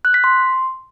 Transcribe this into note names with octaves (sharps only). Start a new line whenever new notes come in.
F#6
B6
C6